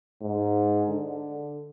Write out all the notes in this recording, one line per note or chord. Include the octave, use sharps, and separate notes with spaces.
G#2
D3